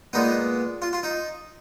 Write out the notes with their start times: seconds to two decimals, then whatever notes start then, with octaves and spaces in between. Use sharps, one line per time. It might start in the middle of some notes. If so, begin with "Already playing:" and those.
0.13 A#2 G#3 B3 D#4
0.82 F4
0.93 F4
1.03 D#4